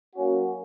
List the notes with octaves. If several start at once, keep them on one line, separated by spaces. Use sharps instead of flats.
F#3 A#3 C#4 F#4